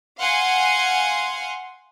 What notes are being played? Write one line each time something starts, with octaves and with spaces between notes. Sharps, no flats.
F5 F#5 G#5 C6